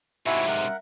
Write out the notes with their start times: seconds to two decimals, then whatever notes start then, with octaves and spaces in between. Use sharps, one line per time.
0.26 G#2 C3 E4 F#4 E5 G#5
0.48 A#4 F#5